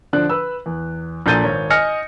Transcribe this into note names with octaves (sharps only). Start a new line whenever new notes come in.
D3 F3 D4 F#6
B4 E6
E2
A#1 A#2 A4 G6 A6 D#7
G#1 C#5
D#5 G#5 D#6 F6 A#6 C#7